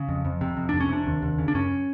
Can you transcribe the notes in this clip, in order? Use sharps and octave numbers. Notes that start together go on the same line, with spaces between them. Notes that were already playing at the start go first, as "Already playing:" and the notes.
Already playing: C#3
F2
F2
C3
F2
F2 D4
C#4
C3 D4
D#2
D#2
C#3
D4
F#2 C#4